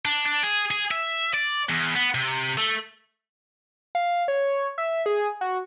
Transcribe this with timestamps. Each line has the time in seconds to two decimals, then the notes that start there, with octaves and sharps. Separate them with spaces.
0.05 D4
0.26 D4
0.43 G#4
0.71 G#4
0.91 E5
1.34 D5
1.69 E2
1.95 B3
2.15 C3
2.58 A3
3.95 F5
4.28 C#5
4.78 E5
5.06 G#4
5.41 F#4